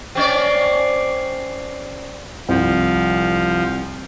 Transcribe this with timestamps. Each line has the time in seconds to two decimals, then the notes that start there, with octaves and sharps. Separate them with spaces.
0.15 C4 C#4 D5
2.48 C2 F3